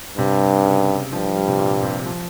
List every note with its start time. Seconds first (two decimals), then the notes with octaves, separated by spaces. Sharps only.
0.17 G2 C3
0.65 C#3
1.12 G2 F3
1.25 F3
1.36 G3
1.48 C3
1.59 A#2
1.83 C3
2.06 F3